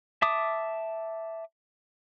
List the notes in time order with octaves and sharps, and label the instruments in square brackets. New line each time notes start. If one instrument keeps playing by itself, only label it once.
[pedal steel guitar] E5 A5 D6 D#6